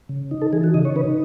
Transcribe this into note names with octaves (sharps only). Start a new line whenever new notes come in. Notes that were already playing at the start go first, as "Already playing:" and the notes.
C#3
D#4
A4
E3 G#4
F#4
C#3 D#5
C#5
D#4 B4